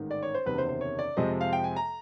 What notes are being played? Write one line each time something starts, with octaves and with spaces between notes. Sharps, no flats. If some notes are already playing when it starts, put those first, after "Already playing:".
Already playing: A1 G#2 D#3
D5
C#5
C5
F#1 E2 C3 D#3 B4
C5
C5
C#5
D5
F2 C3 F3 G#3 C4 D#5
F5
G5
G#5
A#5